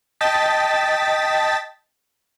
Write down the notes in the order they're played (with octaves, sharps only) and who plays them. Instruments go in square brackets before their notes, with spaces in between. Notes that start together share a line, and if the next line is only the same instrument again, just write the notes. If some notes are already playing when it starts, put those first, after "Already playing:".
[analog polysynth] D#5 G5 A5 A6 B6